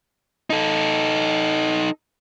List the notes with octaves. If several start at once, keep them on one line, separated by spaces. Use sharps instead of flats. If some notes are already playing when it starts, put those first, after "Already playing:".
D#4 A4